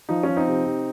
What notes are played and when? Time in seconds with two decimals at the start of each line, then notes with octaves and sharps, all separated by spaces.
0.09 F3 D#4
0.23 F3 C#4
0.37 C4 D#4
0.48 C3
0.66 C3